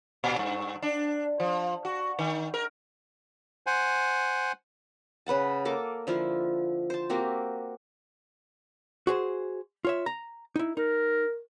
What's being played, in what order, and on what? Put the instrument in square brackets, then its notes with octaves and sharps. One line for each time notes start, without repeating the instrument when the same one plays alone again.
[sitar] A#2
G2
D4
F3
F#4
D#3
A#4
[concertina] C5 F#5 G#5
[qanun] C#3 B4 F#5 A5
A#3 A4 D6
D3 F3 E4 F4
C5 A5
A#3 C4 F#4 G4
[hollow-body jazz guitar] F#4 G#4 C5
F4 C#5 E5
A#5
D#4 E4
[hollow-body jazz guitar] D#4 [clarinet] A#4